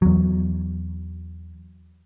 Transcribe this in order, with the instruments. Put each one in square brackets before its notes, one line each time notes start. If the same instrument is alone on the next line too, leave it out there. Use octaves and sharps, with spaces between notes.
[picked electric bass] E2 F#3